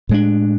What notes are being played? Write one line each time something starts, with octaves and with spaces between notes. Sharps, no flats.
A2 G#3 D4